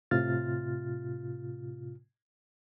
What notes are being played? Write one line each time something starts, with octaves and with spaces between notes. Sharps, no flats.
A2 C3 F4 F6 A6